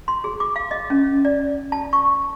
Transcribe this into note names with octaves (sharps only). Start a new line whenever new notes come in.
C6
G#4
D6
F5
D#5
C#4
D5
A5
C#6